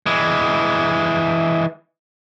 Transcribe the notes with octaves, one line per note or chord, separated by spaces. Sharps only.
E3 G#3